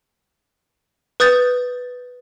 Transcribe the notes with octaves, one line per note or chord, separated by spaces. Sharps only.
B4 D#6 G6 A6